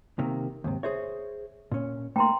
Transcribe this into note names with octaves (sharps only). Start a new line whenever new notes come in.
C3 D#3 A#3
D#2 G#2 C3
G#4 C5 C#5 E5
A#2 C#4
A3 A#3 G5 A#5 C6